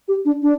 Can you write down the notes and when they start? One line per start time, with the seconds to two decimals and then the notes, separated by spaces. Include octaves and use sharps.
0.08 G4
0.25 D4
0.42 D4